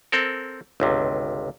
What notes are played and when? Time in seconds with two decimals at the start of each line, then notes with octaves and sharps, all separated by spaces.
0.12 C4 A4 A#4
0.80 G1 C#2 C3